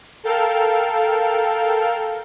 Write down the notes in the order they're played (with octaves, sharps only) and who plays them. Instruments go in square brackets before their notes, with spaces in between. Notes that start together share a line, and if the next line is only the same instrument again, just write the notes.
[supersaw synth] A4 A#4 F5 G5